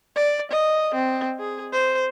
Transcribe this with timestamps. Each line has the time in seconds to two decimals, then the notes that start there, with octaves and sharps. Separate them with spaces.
0.16 D5
0.51 D#5
0.94 C4
1.39 G#4
1.73 C5